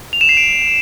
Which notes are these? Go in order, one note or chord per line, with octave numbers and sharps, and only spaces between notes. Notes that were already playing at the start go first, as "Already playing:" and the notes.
F7
E7
C7
D7